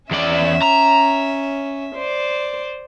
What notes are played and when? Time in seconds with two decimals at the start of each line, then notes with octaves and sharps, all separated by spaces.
0.11 E2 C#4 D5 E5
0.62 A#5
1.96 C5 D5